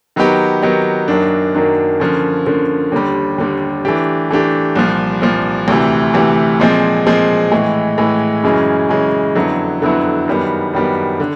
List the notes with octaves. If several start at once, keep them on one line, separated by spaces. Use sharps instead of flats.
D#3 F#3 B3 D#4 G4
D#3 F#3 B3 D#4 G4
F#2 D#3 F#3 A#3 D4
F#2 D#3 F#3 A#3 D4
D3 F3 A#3 C#4
D3 F3 A#3 C#4
D#2 D3 G3
D#2 D3 G3
E3 A3 D4 G4
E3 A3 D4 G4
C2 A#2 F3
C2 A#2 F3
D2 C3 E3
D2 C3 E3
A#2 F3 G#3 C4
A#2 F3 G#3 C4
A2 E3 G#3
A2 E3 G#3
F#2 C#3 E3 G#3 C#4
F#2 C#3 E3 G#3 C#4
F2 D3 F#3 B3 E4
F2 D3 F#3 B3 E4
F#2 D#3 G3 B3
F#2 D#3 G3 B3
D3